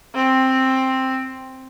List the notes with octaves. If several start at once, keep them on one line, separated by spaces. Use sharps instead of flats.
C4